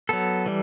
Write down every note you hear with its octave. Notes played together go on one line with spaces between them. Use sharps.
F#3 B3 A4
E3 G3